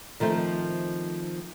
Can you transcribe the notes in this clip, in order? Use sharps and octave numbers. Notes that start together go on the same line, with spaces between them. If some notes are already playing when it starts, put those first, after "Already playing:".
D#3 F3 A3 C4